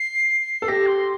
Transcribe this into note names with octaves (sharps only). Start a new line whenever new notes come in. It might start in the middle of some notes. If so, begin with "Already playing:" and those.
Already playing: C7
A4
G4 A#6
C6